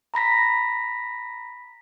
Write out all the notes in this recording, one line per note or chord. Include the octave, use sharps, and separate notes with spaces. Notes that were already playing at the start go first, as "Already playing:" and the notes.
A#5 B5 A#6 B6